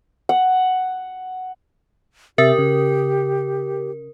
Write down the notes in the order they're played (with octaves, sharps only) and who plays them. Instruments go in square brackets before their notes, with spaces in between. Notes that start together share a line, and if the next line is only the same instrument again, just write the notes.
[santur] F#5
[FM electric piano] C3 E5 A6 [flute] G4 [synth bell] A#4
[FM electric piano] C#3